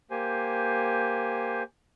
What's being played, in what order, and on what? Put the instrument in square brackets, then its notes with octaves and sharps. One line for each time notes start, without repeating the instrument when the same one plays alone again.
[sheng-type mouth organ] A#3 G4 C5 G#5